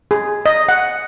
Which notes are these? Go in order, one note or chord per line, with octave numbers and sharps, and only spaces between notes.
G#4
D#5
F#5